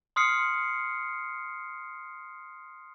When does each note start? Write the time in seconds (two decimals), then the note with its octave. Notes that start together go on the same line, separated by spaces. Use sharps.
0.16 C6 D#6 F6 C7 C#7